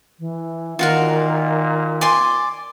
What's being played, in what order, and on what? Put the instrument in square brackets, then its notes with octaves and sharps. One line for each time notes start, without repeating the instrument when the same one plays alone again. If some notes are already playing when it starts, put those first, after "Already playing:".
[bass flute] E3
[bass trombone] A#2 [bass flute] D#3 [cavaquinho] F4 F#4 A#4
[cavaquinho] D5 G#5 C6